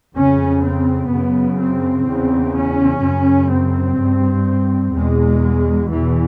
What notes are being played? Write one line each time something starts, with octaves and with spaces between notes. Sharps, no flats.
F2 C#3 C#4
C4
F#2 C#3 B3
C4
E2 C#3
C#4
F#2 C#3
C4
G2
E2 B2 G#3
E2 B2 E3